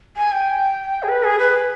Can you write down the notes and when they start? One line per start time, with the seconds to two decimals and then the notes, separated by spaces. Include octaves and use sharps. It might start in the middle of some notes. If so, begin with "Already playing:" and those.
0.17 G#5
0.32 G5
1.03 G#4
1.09 B4
1.24 G#4
1.39 B4